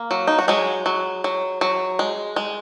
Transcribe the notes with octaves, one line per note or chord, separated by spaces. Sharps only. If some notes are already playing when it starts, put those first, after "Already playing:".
Already playing: A#3
F#3
D#4
F#4
F#3 G#3 G#4
F#3
F#3
F#3
G#3
G#3